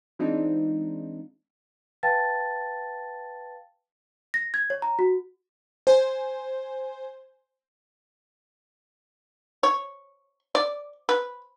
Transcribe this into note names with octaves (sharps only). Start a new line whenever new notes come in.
E3 G#3 C4 D4 D#4 F4
B4 F5 G5 A5 A6
A#6
G#6
C#5
A#5
F#4
C5 G#5
C#5
D5
B4